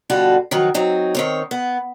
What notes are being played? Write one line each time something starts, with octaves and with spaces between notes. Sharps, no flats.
B2 D3 G3 F4 F#4 A4
D#3 F3 F#3 F#4
F#3 C4 D#4
D#3 C4 C#5
B3